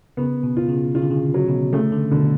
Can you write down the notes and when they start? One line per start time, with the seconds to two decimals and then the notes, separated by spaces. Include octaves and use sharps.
0.17 C#3 B3
0.43 B2
0.57 F4
0.69 C#3
0.95 C#3 F4
1.02 D3
1.11 C#3
1.34 F#3
1.48 B2
1.73 C#3 A3
1.92 D3
2.11 B2 D3